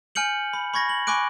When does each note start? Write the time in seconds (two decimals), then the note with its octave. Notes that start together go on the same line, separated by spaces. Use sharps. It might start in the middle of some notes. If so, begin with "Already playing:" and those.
0.15 G#5 F6 G6 C#7 F#7
0.53 B5
0.74 B5 C#6 G#6 A#6
0.89 F#7
1.07 G#5 B5 C#6 D6 F#6 D7